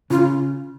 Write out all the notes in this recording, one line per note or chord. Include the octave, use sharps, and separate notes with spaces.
C#3 F4